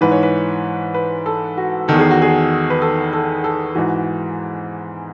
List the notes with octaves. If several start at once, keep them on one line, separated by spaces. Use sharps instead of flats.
G#2 E3 B4
C#5
B4
B4
A4
F#4
E2 D#3 A4
G#4
F#4
G#4
B4
A4
A4
A4
G#2 E3 F#4